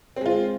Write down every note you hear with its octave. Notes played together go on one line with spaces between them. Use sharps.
G#3 C4 F4